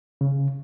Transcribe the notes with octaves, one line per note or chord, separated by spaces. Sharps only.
C#3